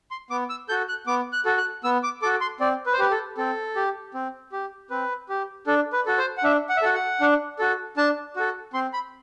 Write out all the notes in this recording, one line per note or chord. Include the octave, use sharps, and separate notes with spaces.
C6
B3 D6
E6
F#4 A4 G6
F#6
B3 D6
F#6
F#4 A4
F#6
B3 E6
D6
F#4 A4 D6
C6
C4 D5
B4
C5
G4 B4
A4
C4 A4
G4
C4
G4
C4 B4
G4
D4 A4
B4
F#4 A4
C5
F#5
D4 E5
F#5
E5
F#4 A4 F#5
F#5
D4
F#4 A4
D4 A5
F#4 A4
C4 C6
B5